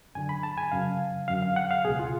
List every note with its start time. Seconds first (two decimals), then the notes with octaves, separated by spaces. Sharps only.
0.15 F#2 D3 G#5
0.29 B5
0.43 A5
0.58 G#5
0.71 F#2 C#3 F5
1.28 F#2 D3 F5
1.42 F5
1.56 F#5
1.71 F5
1.84 B2 G#4
1.89 C#2
1.99 F4